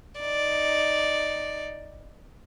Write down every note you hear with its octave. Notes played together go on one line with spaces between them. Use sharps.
D#4 D5